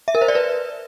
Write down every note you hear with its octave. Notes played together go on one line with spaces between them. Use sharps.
E5
A#4
C5
D5
B4